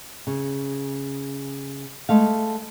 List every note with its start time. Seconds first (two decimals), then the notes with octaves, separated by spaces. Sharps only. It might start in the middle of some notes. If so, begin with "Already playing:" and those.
0.27 C#3
2.09 G#3 A3 F5